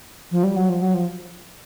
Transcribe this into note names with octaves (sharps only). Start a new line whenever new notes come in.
F3
G3
F#3
F3
F#3
F3